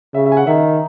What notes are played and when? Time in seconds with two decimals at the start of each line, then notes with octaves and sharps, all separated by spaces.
0.14 C#3 E5
0.26 E5
0.32 G#5
0.37 F#5
0.47 D#3 E5